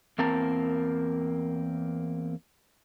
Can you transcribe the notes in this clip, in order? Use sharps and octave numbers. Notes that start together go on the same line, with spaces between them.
E2 A#3 C4 A#4 A5